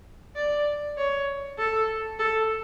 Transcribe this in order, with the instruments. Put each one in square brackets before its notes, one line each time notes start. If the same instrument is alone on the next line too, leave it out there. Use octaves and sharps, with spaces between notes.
[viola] D5
C#5
A4
A4